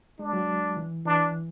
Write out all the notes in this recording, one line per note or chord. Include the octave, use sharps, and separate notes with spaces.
G#3 D4
F#3
E3
E3 D4